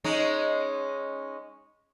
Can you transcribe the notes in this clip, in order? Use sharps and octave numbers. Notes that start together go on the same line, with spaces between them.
G#3 C#4 D#4